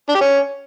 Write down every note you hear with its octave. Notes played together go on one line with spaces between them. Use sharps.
D4
G4
C#4